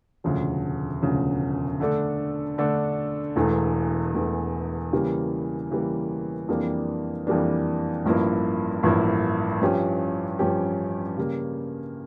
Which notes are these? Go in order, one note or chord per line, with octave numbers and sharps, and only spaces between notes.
E1 D2 C#3 F3
E1 D2 C#3 F3
D3 A3 D4 A4
D3 A3 D4 A4
E1 E2 E3 A3
E1 E2 E3 A3
C#3 E3 G3 A#3
C#3 E3 G3 A#3
F2 E3 G3 A#3 D4
F2 E3 G3 A#3 D4
A1 G2 F3 A#3 E4
A1 G2 F3 A#3 E4
G2 F3 C#4 G4
G2 F3 C#4 G4
C#3 G3 A#3